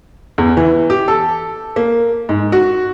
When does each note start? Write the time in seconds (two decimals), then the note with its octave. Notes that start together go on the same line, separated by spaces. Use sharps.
0.38 E2
0.57 E3
0.90 G4
1.08 A4
1.76 A#3
2.29 G#2
2.52 F#4